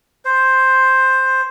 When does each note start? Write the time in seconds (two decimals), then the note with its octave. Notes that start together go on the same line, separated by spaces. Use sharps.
0.25 C5